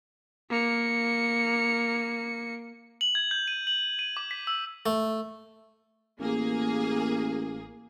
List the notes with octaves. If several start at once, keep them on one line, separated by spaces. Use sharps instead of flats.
A#3 C#7
F#7
G#6
G6
D#7
F#7
D#7
D6
B6
E6
A3
A1 A#3 G#4